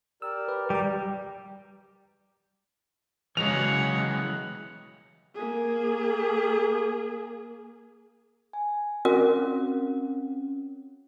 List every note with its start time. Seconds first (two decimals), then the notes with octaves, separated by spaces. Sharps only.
0.22 G4 A#4 D5 E6
0.48 B4
0.70 G3 G5 A#5
3.37 C#3 E3 F#3 G#3 C#5 F#5 F7
5.34 A#3 G#4
8.53 G#5
9.05 C4 C#4 F#4 A#4